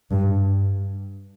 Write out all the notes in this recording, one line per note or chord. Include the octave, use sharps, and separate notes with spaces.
G2